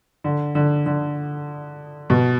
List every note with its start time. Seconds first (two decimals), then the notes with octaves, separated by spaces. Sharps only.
0.24 D3
0.55 D3
0.86 D3
2.10 B2